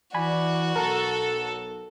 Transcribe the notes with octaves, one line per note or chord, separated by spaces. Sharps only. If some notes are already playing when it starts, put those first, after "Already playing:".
E3 F#4 D5 G#5 B5
B1 A4 A#4